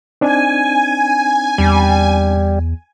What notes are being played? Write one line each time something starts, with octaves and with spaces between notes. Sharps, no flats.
C4 D4 D#4 G#5
E2 G3